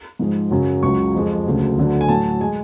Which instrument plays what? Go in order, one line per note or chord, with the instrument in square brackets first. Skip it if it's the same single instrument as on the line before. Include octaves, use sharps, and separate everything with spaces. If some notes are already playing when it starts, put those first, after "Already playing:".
[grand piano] G#2 F3 G#3
F#2 C#3 F#3
C#2 C#3 F#3 C#6
F2 F3 G#3
D2 C#3 F#3
D2 D3 F#3
G#5
A2 F#3 A5
G#3 G#5